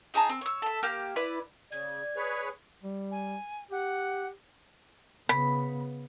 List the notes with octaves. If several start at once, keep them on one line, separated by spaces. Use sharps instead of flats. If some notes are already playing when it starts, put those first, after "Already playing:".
D#4 G#4 A5 A#5
C4
C#5 E6
A4 E5
A#3 G4 F6 G6
E4 B4 D5
C#3 D5 G#6
G#4 B4 C#5
G3
G#5
G4 F#5
C#3 B3 B5